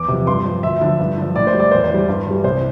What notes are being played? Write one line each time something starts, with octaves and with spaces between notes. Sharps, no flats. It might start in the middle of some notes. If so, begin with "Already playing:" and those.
Already playing: E2 D6
C3 F3
G2 C6
F3
D2 E5
D3 F3
G2
D3 F3
A2 D5
C5
G3
D5
E2 C5
C5
E3 G3
G2
E3 G3
C2 C5